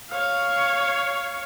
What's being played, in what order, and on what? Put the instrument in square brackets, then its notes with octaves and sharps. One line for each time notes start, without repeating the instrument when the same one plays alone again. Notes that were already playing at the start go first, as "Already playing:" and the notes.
[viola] C#5 F5